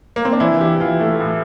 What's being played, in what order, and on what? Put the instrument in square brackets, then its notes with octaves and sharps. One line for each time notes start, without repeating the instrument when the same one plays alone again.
[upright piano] A#3
C4
D4
E3 E4
G4
E3 F4
A3
A2